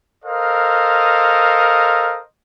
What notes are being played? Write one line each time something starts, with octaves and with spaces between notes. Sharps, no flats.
A4 A#4 C5 D#5 F5